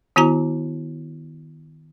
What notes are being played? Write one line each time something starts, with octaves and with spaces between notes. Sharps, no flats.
D#3 B3 E4 F#4 A#5